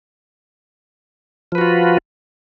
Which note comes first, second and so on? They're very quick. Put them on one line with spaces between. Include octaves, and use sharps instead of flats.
F3 B4 F#4 F4